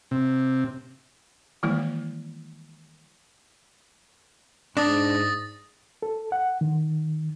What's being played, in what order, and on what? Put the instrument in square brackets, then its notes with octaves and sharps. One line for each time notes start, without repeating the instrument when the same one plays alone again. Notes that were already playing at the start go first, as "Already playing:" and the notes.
[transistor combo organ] C3
[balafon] D#3 E3 G3 G#3 A#3 E4
[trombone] G#2 [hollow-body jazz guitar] D4 [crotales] D#6 A6 A#6
[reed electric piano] A4
F#5
D#3